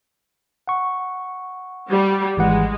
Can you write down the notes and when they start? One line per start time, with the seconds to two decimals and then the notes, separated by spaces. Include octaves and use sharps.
0.68 F#5 C#6
1.90 G3
2.37 G#1 E3 G#3 F#5